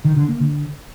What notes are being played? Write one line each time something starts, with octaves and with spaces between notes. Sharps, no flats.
D#3
D3
A#3
D3